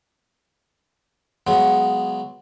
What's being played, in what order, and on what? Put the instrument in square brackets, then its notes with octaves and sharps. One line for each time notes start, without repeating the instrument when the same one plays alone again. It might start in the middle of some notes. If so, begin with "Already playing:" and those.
[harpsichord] C#3 F#3 G#3 B3